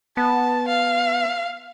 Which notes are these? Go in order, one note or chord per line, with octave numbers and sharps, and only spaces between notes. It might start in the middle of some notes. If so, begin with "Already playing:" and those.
B3 A5
F5